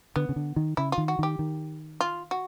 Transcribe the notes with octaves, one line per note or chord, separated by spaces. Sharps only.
D3 B3
C#3
D3
D#3
C#3 E4
F4
D#3
F#4
D#3 G4
D#3
F4
F#4